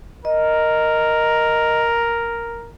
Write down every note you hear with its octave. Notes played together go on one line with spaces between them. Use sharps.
A#4 D#5